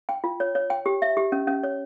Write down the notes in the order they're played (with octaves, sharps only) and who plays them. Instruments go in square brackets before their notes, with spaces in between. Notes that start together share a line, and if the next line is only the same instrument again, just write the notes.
[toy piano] G5
F4
C#5
C#5
G5
G4
E5
G4
C#4
C#4
C#5